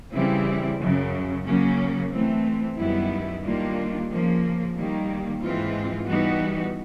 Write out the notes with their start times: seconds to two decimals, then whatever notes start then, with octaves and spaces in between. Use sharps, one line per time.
0.14 C#3 E3 G3 C4 E4
0.80 F#2 C#3 F#3
1.45 C#3 F#3 A#3 C#4
2.12 E3 A3 C4
2.78 F#2 D#3 G3 B3 E4
3.43 D#3 G3 A#3 D4 F4
4.10 C#3 F3 A#3
4.76 D#3 G3 A#3
5.42 G#2 E3 G#3 C4 F4
6.07 E3 G3 B3 D#4 F#4